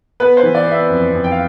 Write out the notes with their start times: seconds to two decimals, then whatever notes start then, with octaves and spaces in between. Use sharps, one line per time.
0.20 B3 B4
0.37 C5
0.43 E3
0.55 D5
0.66 B3 E5
0.89 F2
1.13 F2
1.24 G5
1.32 F5